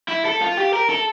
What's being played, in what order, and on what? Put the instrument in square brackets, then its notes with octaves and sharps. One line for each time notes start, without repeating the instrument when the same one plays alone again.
[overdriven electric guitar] E4
A4
F4
G4
A#4
A4